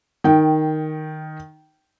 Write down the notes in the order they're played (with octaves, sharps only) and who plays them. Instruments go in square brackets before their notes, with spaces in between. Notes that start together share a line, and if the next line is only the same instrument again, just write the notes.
[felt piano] D#3 G5